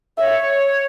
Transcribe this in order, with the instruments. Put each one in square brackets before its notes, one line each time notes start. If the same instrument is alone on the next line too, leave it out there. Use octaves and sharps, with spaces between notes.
[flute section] C#5 [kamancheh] E5